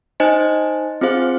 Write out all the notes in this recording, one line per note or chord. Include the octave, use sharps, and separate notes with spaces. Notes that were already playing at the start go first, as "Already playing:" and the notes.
D#4 C5 D#5 G#5
C4 F4 G#4 C5 F5